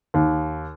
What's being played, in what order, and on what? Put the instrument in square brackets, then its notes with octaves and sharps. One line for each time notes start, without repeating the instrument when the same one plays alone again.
[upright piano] D#2